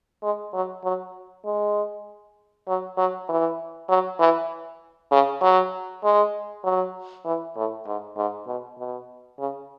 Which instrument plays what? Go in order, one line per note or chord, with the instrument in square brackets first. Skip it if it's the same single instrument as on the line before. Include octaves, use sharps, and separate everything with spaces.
[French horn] G#3
F#3
F#3
G#3
F#3
F#3
E3
F#3
E3
C#3
F#3
G#3
F#3
E3
A2
G#2
G#2
B2
B2
C#3